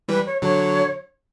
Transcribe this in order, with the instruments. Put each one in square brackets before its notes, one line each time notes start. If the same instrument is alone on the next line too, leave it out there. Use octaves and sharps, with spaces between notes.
[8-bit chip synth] E3 G3 [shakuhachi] B4
[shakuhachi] C#5
[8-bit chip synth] D3 F#3 [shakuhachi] C#5